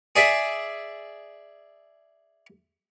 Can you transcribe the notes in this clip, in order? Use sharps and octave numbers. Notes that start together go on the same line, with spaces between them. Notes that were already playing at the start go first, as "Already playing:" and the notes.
G#4 D5 E5